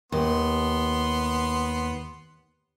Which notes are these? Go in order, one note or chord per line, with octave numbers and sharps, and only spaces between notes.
D#2 B3 C6